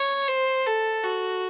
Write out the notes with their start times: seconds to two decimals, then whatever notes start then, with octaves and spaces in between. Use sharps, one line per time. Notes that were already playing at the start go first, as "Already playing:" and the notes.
Already playing: C#5
0.29 C5
0.66 A4
1.04 F#4